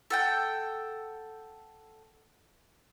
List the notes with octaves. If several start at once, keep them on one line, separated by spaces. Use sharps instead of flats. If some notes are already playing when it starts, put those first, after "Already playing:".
A4 F#5 G5